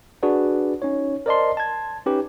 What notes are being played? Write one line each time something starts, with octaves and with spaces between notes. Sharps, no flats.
D4 F#4 G#4 B4 D5
C#4 D#4 C#5
A#4 C5 D5 D#5 A5 C6
A5 G#6
C#4 D#4 G4 B4